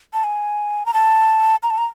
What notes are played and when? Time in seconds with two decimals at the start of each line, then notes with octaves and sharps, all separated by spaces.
0.13 A5
0.24 G#5
0.86 A#5
0.94 A5
1.63 A#5
1.70 A5
1.78 A#5